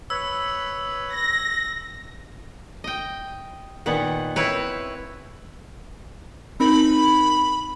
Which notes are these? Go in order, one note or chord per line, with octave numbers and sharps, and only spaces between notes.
B4 C#5 B5 E6
A#6
D#5 G5
A#2 D#3 B3 F#5
C4 E4 B4 C#5
C4 D#4 A#4 B5